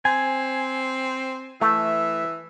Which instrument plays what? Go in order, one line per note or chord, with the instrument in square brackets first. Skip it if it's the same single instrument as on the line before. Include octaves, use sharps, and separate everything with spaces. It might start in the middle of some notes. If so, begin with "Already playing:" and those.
[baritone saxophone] C4 [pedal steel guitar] G#5
[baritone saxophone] E3 [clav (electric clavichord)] A3 [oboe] E5